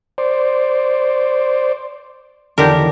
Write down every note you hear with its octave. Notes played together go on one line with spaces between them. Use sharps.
C5 D5
E2 D3 D#3 G4 A#4